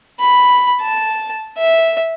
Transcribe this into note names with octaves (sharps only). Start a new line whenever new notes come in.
B5
A5
E5